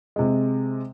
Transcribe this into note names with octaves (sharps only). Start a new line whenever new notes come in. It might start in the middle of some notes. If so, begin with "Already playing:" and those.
C3 G#3